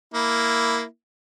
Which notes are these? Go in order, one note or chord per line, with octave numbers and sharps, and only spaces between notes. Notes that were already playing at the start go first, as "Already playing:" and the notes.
A#3 E4